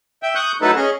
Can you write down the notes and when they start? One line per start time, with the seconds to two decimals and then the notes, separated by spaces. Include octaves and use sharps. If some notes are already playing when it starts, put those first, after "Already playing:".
0.23 E5 G5
0.35 C#6 D#6 F#6 G6
0.62 F#3 A3 D#4 E4 A4 B4
0.76 C#4 G#4 D#5